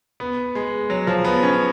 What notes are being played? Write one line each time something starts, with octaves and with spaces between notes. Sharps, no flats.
B3
G#3
F#3
F3
B3
C#4